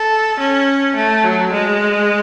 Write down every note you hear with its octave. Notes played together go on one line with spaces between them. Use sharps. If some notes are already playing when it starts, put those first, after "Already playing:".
Already playing: A4
C#4
A3
F#3
G#3